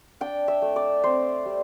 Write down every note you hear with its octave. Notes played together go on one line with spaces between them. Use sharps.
D4 G5
E5
A3
D5
C4 C5
G3